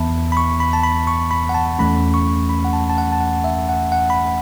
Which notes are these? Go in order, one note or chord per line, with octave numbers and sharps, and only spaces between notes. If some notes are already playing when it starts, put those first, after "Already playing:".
Already playing: E2 E3 B3 E5 A5 B5
B5
C#6
B5
A5
B5
C#6
B5
F#5
A5
E2 E3 A3 C#4 B5
C#6
B5
F#5
A5
A5
F#5
A5
F#5
E5
F#5
F#5
B5